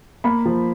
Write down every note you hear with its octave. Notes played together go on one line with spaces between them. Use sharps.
A#3 B5
F3